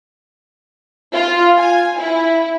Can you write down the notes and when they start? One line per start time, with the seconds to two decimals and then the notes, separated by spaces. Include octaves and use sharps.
1.14 F4
1.59 G#5
1.99 E4